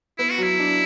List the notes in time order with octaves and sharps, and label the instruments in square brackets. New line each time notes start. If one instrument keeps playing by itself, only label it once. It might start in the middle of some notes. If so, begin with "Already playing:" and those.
[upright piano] B3 [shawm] E4
[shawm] F#4
[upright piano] F#3 [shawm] E4
[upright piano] D4